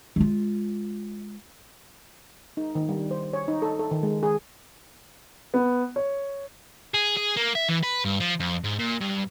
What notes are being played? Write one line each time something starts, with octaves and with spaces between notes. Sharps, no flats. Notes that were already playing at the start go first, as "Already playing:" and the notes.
G#3 F4
D#4
D#3
G3
C5
C#5
D#4
A4
A4
D#3
G#3
G#4
B3
C#5
G#4
G#4
A#3
E5
E3
B4
G2
F3
F2
G#2
A#2
G2